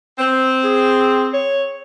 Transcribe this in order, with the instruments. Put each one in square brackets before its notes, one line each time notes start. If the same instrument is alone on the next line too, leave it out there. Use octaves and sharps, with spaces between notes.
[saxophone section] C4
[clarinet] G#4
C#5